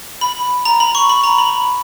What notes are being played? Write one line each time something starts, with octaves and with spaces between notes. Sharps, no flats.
B5
A#5
B5
C#6
B5
A#5
B5